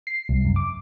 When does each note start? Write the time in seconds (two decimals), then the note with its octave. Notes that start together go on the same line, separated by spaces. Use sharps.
0.07 C7
0.29 C2
0.45 F#2
0.56 D6